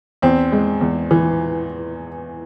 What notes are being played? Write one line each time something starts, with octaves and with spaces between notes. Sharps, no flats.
E2 C4
G#3
E2
E3